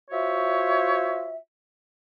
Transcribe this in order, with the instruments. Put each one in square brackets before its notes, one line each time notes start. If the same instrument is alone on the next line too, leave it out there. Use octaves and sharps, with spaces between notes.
[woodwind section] F4 F#4 C5 C#5 E5